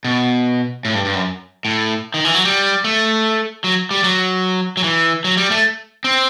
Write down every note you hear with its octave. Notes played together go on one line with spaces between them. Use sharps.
B2
A2
G2
G2
F#2
A2
D#3
E3
F#3
G3
A3
F#3
G3
F#3
F#3
E3
F#3
G3
A3
C4